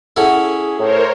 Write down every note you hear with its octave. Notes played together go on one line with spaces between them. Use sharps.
C#4 E4 G#4 A4 F#5
A2 A#4 C5 C#5